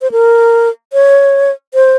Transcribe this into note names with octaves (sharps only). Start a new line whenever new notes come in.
C5
A#4
C#5
C5